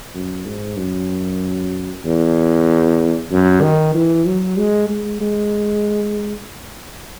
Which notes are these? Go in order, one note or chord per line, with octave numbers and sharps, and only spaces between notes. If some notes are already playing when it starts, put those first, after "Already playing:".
F#2
G#2
F#2
E2
F#2
D#3
E3
F#3
G#3
G#3
G#3